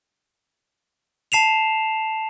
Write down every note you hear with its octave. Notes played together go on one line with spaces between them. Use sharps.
A5 C7 E7 F7